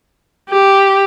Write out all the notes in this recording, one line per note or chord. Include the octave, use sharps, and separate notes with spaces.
G4